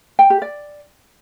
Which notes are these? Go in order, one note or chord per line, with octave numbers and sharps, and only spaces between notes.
G5
G4
D5